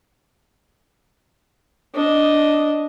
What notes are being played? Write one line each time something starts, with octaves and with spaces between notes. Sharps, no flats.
D4 D#5